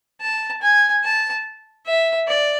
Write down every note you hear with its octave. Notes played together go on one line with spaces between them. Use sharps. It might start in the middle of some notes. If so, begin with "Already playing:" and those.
A5
G#5
A5
E5
D5